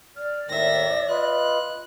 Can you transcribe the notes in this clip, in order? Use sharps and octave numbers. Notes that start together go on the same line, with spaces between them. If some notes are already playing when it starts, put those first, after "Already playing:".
D5 F6
D#2 A2 D#3 E5 A#6
F4 B4 D#5 F#6